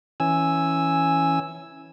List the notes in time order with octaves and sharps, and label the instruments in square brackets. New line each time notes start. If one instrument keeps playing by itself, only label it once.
[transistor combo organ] E3 C#4 G#5 E6